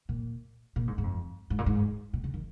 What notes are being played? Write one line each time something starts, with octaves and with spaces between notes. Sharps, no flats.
A#2
A#2
G#2
G#2
F2
G#2
A#2
G#2
A#2
C#3
D#3